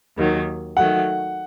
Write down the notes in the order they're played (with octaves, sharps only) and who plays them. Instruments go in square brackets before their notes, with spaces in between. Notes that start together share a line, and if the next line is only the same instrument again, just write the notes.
[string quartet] D#2 D#3 F#3
[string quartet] D#3 F#3 A3 [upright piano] F#5